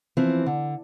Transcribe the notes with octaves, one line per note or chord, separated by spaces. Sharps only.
E3 F3 C4
D3